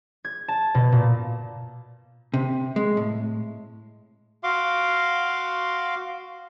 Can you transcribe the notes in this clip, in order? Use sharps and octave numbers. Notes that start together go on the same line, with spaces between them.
G#6
A5
B2
A#2
C3
G#3
A2
F#4 F5 C6 D6